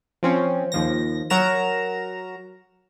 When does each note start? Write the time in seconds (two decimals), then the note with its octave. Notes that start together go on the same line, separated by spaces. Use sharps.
0.23 F3 C4 C#4
0.72 D#2 F3 A#6
1.30 F#3 F#4 A#4 A#5 E7